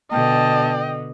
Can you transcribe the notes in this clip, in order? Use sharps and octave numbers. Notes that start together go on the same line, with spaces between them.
B2 D3 D#5 G5 A5